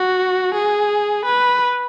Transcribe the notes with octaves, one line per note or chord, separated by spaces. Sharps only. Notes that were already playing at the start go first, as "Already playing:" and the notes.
Already playing: F#4
G#4
B4